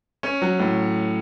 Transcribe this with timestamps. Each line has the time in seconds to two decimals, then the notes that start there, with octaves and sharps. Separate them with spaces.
0.23 C#4
0.42 F#3
0.59 A2